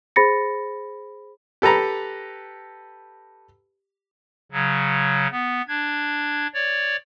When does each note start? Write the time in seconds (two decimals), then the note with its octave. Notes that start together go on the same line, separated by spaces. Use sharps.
0.16 G#4 C5 B5 A6 A#6 C#7
1.62 G4 A4 B4 A#5
4.52 C#3 F#3
5.31 B3
5.68 D4 G#6
6.54 C#5 D5